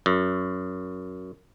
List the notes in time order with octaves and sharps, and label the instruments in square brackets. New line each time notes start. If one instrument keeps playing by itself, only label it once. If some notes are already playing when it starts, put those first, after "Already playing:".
[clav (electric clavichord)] F#2